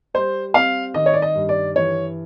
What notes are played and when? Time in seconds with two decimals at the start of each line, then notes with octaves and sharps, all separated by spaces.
0.14 G3 C5
0.54 C4 F5
0.94 D#3 D#5
1.06 C#5
1.14 D5
1.22 D#5
1.35 G2
1.49 D5
1.75 E3 C#5